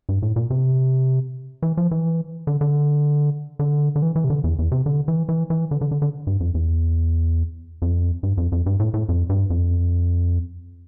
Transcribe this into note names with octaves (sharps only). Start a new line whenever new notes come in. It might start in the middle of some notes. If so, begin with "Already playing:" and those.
G2
A2
A#2
C3
E3
F3
E3
D3
D3
D3
D3
E3
E3
C3
D3
E2
E2
C3
D3
E3
E3
E3
D3
D3
D3
D3
G2
F2
E2
F2
G2
F2
F2
G2
A2
A2
F2
G2
F2